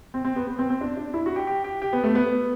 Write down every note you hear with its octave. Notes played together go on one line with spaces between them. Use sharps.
C4
C4
B3
B3
C4
C4
D4
D4
E4
F#4
G4
G4
G4
G4
B3
A3
B3